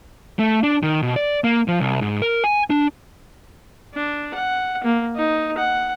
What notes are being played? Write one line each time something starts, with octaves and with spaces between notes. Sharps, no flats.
A3
D4
D#3
B2
D5
A#3
F3
C2
G#2
A#4
G#5
D4
D4
F#5
A#3
D#4
F#5